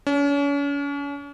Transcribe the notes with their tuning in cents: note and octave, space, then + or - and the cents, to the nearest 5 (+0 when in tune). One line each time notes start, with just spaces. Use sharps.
C#4 +40